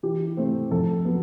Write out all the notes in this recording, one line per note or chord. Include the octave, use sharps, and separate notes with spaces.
E3 G4
A3 C4
F2 A4
F#3 B3